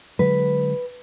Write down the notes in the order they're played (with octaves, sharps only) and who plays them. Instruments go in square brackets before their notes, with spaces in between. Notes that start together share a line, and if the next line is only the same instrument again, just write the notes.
[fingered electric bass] D3 F#3 G#3 [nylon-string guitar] B4